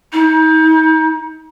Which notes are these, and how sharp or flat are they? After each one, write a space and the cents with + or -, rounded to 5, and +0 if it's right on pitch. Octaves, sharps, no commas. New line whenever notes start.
D#4 +35